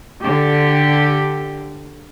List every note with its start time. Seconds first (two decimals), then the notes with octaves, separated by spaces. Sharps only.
0.22 D3 G4